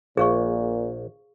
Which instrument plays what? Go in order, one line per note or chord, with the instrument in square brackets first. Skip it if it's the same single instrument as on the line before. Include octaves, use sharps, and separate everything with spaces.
[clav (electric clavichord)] A#1 [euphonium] A#2 [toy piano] G#4 F5 C#6